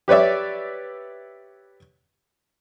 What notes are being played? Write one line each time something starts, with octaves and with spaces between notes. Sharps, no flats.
G4 B4 C#5 D5 E5